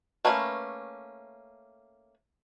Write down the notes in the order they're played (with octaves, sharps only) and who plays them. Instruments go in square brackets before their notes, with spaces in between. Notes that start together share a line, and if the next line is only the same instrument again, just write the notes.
[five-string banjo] A3 A#3 C#4 B4